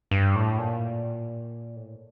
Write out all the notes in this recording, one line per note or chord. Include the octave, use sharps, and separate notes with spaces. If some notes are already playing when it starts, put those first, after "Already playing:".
G2
A2
A#2
A2